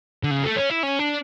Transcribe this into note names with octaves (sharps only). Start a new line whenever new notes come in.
D3
C#3
A3
C#4
E4
C#4
D4